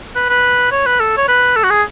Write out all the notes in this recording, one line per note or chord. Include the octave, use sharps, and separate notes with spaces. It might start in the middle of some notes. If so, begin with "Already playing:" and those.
B4
B4
C#5
B4
A4
C#5
B4
A4
F#4
G#4